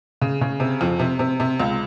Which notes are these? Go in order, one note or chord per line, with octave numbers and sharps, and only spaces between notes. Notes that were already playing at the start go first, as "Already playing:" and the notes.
C#3
C#3
C3
F2
C3
C3
C3
C#2